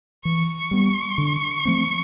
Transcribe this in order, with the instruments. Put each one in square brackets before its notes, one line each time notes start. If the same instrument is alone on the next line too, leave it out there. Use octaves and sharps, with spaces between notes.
[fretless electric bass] E3 [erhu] C#6
[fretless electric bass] G3 B3
D3
F3 A3 C4